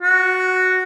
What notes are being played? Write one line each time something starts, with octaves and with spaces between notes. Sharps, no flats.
F#4